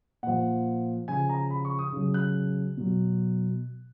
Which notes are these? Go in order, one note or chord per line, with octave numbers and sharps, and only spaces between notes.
A#2 F3 F#5
C#3 F3 G#5
A#5
B5
C#6
D#6
C#3 F#3
F#6
B2 F#3